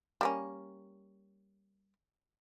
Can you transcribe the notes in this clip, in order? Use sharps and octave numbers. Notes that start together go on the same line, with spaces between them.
G3 A#3 C#4